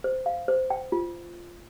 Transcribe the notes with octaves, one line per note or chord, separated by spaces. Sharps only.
C5
F5
C5
G5
F4